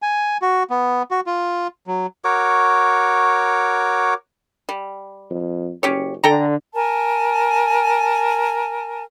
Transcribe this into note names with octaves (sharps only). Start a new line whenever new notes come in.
G#5
F#4
B3
F#4
F4
F#3
F#4 A#4 C#5 D6
G3
F2
F#1 C#4 G4 C#5
D3 A4 G5 A#5
A#4 G#5 A5